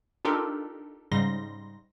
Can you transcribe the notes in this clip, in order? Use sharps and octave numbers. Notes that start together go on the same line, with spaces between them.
D4 D#4 F4 G4 A4 A#4
G#2 C#3 G3 D#4 C6 A#6